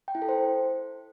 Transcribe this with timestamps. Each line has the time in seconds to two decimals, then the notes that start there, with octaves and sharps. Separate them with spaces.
0.08 G5
0.15 E4
0.22 A4
0.29 C5